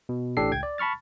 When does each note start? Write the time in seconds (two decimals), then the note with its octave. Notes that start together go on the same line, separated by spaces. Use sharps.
0.09 B2
0.37 A1 A2 D4 G4 A4 C7
0.51 C#2 G5 G#6
0.63 D5
0.78 A5 B5 C#6 F6 A6